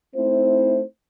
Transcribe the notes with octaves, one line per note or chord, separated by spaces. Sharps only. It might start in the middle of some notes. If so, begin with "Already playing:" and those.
A3 C4 D#4 E4 C5